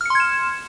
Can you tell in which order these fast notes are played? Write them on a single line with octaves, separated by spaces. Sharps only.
F6 C#7 C6 G#6 E7